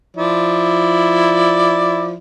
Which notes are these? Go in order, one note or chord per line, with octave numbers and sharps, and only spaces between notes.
F3 E4 D5